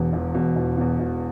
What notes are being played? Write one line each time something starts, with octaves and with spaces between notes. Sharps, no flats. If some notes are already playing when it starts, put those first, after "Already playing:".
Already playing: E1 E2 B2
E1
E2 B2
E1
E2 B2
E1